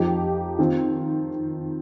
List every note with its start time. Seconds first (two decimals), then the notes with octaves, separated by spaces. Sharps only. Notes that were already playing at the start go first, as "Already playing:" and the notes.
Already playing: F2 F3 D#4 G4
0.59 D#3 C4 F4